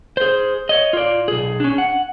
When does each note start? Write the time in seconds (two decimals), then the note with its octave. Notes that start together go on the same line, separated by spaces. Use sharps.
0.17 G#4 C5
0.69 C#5 D#5
0.93 F4 D5
1.28 B1 G#4
1.60 C#4 D4
1.78 F#5